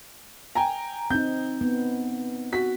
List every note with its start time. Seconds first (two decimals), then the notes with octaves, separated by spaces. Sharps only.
0.55 G5 G#5 A#5
1.10 C4 D#4 G6
1.61 B3
2.53 F#4 B6